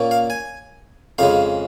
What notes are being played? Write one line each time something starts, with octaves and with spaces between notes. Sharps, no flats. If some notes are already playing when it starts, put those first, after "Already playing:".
Already playing: A#2 A#3 C#4
F5
G#5
F2 C#3 G#3 F5